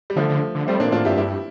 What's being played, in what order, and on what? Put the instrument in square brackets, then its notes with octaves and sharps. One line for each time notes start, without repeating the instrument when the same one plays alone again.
[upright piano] G3
[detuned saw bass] D3 [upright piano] F3 A3
[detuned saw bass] D3
D3
[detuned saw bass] G3 [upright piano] A3 C4
[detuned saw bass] A#2 [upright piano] A#3 D4
[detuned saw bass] A2 [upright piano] D4 F4
[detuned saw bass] G2 [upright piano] E4 G4
[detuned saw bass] G2 [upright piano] E4 G4